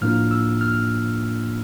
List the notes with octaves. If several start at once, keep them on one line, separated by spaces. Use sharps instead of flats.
A2 F3 A#3 D4 F4 F6
E6
F6